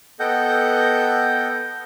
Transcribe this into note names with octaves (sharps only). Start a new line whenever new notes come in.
B3 A4 D#5 F#5 G5 G6